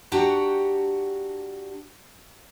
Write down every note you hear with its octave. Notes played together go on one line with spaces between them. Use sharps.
D4 F#4 G4 F#5 G5 A#5